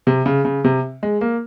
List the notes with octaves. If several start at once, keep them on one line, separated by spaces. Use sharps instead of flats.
C3
C#3
C#3
C3
G#3
A#3